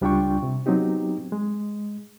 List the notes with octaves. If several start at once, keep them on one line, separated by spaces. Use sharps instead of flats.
C#2 G3 D4 F4 G5 C#6
C3
F#3 B3 C4 D#4 G4
G#3